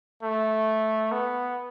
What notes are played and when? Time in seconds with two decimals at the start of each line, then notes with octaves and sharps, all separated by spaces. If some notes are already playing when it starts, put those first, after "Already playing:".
0.23 A3
1.12 B3